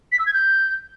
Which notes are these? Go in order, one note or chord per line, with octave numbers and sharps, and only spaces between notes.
B6
E6
G#6
G6